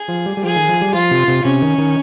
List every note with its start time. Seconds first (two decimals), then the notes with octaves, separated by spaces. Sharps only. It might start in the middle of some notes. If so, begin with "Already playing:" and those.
Already playing: G#4
0.08 F3
0.26 G3
0.37 G3
0.43 F3 G#4
0.56 D#3
0.69 F3
0.82 G3
0.94 F3 F4
1.11 C3
1.28 C3
1.44 C3 C#4
1.62 D#3
1.78 D#3